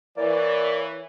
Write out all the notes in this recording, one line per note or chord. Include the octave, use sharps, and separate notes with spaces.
E3 A#3 C#5 D5